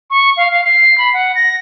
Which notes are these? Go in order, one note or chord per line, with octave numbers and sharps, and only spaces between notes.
C#6
F5
F5
C7
B5
F#5
A#6